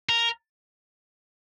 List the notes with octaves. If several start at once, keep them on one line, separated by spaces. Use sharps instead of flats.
A#4